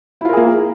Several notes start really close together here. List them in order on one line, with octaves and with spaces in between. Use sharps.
E4 F4 A#4 G#4 A#3